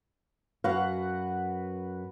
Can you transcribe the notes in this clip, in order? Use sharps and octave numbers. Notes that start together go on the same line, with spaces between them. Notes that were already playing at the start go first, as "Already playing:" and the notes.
F#2 F#4 B4 F5 F#5